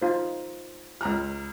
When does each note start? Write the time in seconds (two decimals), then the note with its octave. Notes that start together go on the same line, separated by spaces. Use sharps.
0.02 D#4 F4 C5
1.01 C#2 A#5 F6